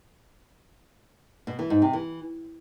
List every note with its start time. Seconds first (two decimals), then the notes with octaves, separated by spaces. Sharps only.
1.47 B2
1.59 E3
1.70 G#2
1.82 C3
1.93 E3